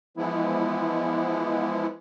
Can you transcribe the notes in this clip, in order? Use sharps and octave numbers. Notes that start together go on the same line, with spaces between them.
E3 F3 G#3 B3 E4